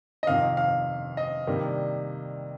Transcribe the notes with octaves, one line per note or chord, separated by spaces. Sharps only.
D#5
F2 C3 D#3 F5
F5
D#5
C3 D#3 G3 A#3 D4